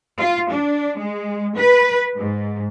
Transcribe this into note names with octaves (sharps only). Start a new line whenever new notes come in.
F4
D4
G#3
B4
G#2